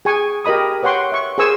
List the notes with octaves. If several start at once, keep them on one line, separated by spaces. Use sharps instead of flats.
G#4 G5 G#5 C#6
G4 A#4 D#5 B5 D#6
B4 C#5 F#5 G5 C6 C#6
E5 C#6
G#4 A#4 C5 G#5 C#6 E6